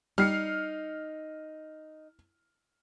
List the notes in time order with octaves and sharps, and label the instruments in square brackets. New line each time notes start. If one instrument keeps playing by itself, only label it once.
[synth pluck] G3 [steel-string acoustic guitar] D#4 [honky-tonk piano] F6 C7 C#7